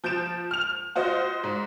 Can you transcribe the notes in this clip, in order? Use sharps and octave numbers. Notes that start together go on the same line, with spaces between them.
F3 G6 A6 D7 E7
F6 F7
F4 F#4 C5 D#5
G#2